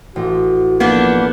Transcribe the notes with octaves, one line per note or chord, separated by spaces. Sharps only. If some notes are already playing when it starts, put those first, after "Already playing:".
A1 F#4
B2 F3 A#3 B3 D4 G6